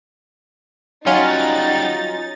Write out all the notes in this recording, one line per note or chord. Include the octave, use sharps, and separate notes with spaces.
F#3 G3 C#4 D#4 F4 F#5 A6